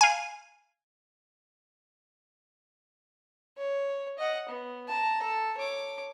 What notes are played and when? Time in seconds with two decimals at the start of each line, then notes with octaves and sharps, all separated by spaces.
0.01 F5 G#5
3.57 C#5
4.19 D#5 F#5
4.49 B3
4.88 A5 A#5
5.22 A4
5.57 C#5 D6